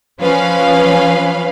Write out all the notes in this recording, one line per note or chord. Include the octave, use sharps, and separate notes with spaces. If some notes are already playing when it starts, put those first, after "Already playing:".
F3 C#4 B4 F5